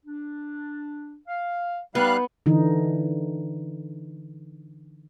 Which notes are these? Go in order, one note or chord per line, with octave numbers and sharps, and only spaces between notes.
D4
F5
G3 B3 D#4 F5 F#6
D3 E3 D#4